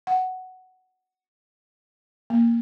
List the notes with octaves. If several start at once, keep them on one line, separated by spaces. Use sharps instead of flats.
F#5
A#3